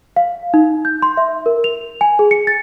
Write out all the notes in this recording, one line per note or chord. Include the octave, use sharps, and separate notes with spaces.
F5
D#4
G6
C6
E5
A#4
F7
G#5
G#4
C#7
A6